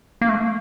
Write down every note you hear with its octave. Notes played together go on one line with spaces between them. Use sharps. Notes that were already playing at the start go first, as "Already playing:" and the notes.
A#3
A3